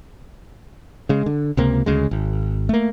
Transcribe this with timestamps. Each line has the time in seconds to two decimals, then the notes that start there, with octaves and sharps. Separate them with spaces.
1.09 C#3 G#3
1.26 D3
1.57 C#2 C3 A#3
1.86 D2 C#3 G#3
2.11 G#1
2.69 A3 A#3